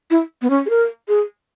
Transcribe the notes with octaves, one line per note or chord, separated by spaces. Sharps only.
E4
B3
C#4
G#4
A#4
G#4